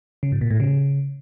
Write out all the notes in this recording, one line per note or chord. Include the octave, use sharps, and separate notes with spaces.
C#3
G#2
A#2
A2
C#3